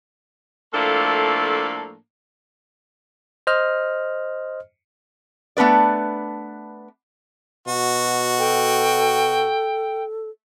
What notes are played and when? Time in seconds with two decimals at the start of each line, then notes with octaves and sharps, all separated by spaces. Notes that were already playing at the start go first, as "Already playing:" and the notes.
0.73 A2 F3 A3 A#3 D4 A4
3.47 C5 D#5 F6
5.57 A3 B3 D4 B4 D5
7.68 B2 F#4
8.39 A4 G5